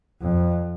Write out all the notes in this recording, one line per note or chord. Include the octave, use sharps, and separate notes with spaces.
F2